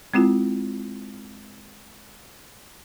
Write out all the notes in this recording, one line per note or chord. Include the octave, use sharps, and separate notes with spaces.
G#3 C4 E4 F4